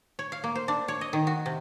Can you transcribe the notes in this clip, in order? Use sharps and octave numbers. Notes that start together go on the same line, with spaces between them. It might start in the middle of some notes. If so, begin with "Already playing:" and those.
C#5
F5
A#3
C5
D4
C#5
D#5
D#3
F#4
C3